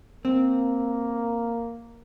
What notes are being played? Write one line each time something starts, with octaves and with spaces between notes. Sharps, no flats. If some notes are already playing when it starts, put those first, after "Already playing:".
A#3 C4